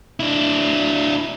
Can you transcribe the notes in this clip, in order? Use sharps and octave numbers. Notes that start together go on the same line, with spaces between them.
D4 E4